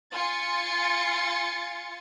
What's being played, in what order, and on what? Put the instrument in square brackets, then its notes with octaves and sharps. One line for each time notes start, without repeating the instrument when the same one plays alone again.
[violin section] F4 G#5 C6 A6 C7 C#7